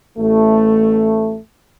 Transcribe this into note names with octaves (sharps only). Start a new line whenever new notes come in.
A1 A3